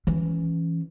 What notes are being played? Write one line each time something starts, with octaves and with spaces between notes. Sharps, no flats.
E3 C#4